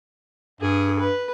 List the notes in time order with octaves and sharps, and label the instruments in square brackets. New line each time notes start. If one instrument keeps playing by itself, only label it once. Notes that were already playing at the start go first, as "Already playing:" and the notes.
[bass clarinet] G2 [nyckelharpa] G#4
[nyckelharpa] B4